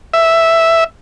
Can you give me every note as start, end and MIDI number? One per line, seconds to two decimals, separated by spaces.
0.13 0.84 76